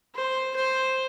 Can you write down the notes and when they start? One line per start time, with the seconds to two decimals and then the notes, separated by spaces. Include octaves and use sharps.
0.15 C5
0.56 C5